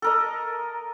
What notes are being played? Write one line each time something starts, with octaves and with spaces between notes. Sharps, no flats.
A4 A#4 D#5